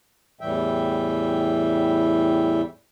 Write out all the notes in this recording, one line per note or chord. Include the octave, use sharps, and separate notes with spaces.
E2 A2 E3 G3 E5 G5